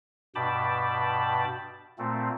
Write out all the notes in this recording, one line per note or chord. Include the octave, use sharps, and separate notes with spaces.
G2 B2 G5 A5 B5 D6
A#2 A3 C4